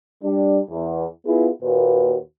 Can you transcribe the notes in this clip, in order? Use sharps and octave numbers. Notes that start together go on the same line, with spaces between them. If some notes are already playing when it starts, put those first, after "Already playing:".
G3 D4
E2
B3 E4 F4 G#4
D#2 A#2 F#4 B4